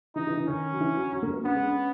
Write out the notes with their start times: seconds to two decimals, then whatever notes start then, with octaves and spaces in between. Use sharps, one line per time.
0.16 E3 D#4
0.27 E3
0.37 E3
0.48 D#3 C#4
0.72 F#3
0.80 E3
0.96 F#3
1.12 F#3
1.23 A#3
1.34 B3
1.44 B3 C#4
1.55 G#3
1.66 C#4